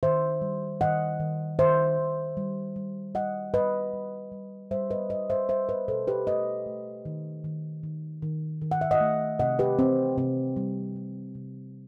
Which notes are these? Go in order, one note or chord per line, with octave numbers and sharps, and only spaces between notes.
D#3 C5 E5
G3
D#3 D#5 F#5
D#3
D#3 C5 E5
D#3
G3
G3
G3 D#5 F#5
G3 B4 D#5
G3
G3
G3 C5 E5
B4 D#5
G3 B4 D#5
C5 E5
G3 C5 E5
B4 D#5
B2 A4 C5
G4 B4
A3 B4 D#5
A3
D#3
D#3
D#3
D#3
D#3
F#5
E5
D#5 F#5
A3
C3 D#5 F#5
G4 B4
E3 C4
C3 C4
G3
G3
C3